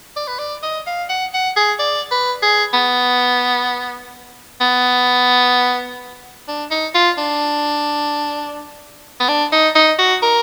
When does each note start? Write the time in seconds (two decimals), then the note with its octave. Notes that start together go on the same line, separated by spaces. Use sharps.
0.16 D5
0.28 B4
0.39 D5
0.63 D#5
0.87 F5
1.09 F#5
1.34 F#5
1.56 G#4
1.79 D5
2.11 B4
2.42 G#4
2.73 B3
4.61 B3
6.48 D4
6.71 D#4
6.95 F4
7.18 D4
9.20 B3
9.28 D4
9.52 D#4
9.76 D#4
9.99 F#4
10.23 A#4